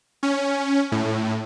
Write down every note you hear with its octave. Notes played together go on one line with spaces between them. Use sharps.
C#4
A2